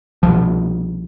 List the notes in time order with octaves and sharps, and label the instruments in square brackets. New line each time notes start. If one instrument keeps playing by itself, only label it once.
[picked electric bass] C2 B2 F3